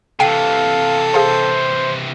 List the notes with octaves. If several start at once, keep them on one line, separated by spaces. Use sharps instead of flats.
C3 E3 A4 F5 G5 C7 D#7
G#4 C5 F5 A5